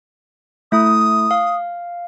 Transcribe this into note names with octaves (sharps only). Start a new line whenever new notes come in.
A3 E4 D#6
F5